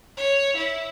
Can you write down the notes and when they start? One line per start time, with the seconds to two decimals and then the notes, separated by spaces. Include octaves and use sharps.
0.18 C#5
0.57 E4